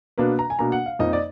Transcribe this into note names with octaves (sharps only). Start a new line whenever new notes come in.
B2 A#3 D4 B4
A#5
G#5
B2 A#3 D4 A#5
F#5
F5
F2 F3 A#3 D#4 D#5
D5